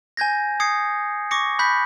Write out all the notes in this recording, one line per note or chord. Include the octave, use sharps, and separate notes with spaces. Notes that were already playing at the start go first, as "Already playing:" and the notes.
G#5 G6 G#6 A#6
D#6 G#6 C7 C#7
C#6 D6 A#6 C#7
B5 F#6 G6 B6